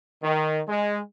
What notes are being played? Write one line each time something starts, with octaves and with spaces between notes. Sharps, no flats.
D#3
G#3